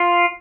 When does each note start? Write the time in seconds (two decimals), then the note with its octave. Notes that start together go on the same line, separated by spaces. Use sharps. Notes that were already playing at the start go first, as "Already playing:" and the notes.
Already playing: F4